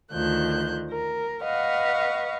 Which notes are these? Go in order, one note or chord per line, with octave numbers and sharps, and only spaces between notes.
D2 D#3 F3 F#6 G6
A#4
B4 D#5 F5 F#5 C#6